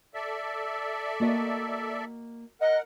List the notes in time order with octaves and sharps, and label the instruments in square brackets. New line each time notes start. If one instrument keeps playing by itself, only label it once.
[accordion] A4 D5 E5
[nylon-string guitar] A#3 F#4 D#5
[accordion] A#4 F#5 [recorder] D#5